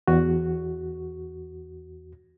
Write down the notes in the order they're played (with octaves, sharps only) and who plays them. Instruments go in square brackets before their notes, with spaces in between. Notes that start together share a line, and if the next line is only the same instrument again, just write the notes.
[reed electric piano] E2 F#4